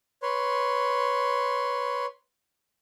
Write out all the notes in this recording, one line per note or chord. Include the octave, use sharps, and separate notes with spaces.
B4 C#5 C6